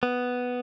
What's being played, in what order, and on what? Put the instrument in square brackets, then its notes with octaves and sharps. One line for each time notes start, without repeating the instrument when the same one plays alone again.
[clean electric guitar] B3